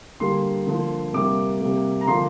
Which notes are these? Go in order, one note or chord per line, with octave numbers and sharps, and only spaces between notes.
D3 G3 A#3 C6
D3 F3 A#3
C3 G3 A#3 D6
C3 G3 A#3
A#5
D3 F3 A#3 C6